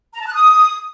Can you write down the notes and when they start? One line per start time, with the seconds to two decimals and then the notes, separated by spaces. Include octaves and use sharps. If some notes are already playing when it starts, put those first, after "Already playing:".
0.14 A#5
0.20 A5
0.27 F#6
0.34 D#6